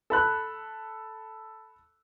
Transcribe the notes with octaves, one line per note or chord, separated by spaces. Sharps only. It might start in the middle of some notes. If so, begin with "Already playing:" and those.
A4 B5 F#6